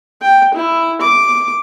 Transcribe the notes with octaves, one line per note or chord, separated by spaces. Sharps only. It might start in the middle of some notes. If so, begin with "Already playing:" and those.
G5
E4
D6